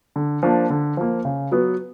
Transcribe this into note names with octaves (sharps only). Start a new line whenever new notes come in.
D3
F3 A#3 D4
D3
F3 A#3
C#3
F#3 B3